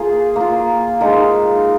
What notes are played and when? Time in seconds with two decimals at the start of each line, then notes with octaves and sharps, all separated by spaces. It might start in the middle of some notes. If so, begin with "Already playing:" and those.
Already playing: A#3 F4 G#4
0.36 A#3 F4
1.01 G#3 D#4 A#4